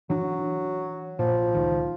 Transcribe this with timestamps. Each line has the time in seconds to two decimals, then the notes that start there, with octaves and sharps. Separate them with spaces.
0.10 E3 F#3 D4
1.19 A#2 F3
1.54 C#2 D#3